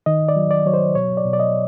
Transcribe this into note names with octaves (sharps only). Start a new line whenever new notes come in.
D#3 D#5
D5
F#3
D5
F#3 C#5
C5
B2 C#5
D5
B2
D5
D#5